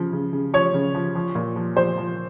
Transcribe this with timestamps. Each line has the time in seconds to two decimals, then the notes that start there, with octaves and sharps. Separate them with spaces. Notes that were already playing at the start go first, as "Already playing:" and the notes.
Already playing: C#3 F3
0.13 C#3
0.33 C#3
0.53 F3 C#5
0.74 C#3
0.95 F3
1.15 F3
1.35 A#2
1.56 F3
1.76 F3 C5
1.98 F3